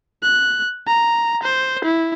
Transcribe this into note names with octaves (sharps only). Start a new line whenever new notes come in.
F#6
A#5
C5
E4